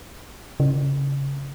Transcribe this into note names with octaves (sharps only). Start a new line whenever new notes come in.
C#3